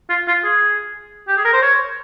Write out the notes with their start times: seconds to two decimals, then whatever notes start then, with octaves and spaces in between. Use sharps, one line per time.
0.10 F4
0.28 F4
0.44 G#4
1.28 G4
1.37 G#4
1.45 A#4
1.53 C5
1.62 C#5